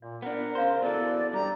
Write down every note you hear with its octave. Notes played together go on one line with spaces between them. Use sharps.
A#2 D5
B3 D4 A#4 C5
C#3 C5 F5 C6
B2 E3 A4 D5
G2 G4 A#5 D6